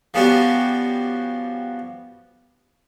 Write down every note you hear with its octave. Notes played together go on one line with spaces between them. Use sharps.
F3 G3 B3 C#4 F#4 G4